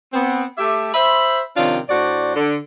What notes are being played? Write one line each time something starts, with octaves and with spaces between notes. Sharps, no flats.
B3 C4
A3 G4 E5
C5 E5 B5
C3 D#3 F3 C#4 D4 F4
A2 D4 F#4 C5 D5
D3